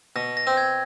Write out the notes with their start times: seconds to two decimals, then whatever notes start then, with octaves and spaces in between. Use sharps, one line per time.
0.16 B2 A#6
0.37 A#6
0.47 C4
0.57 G#6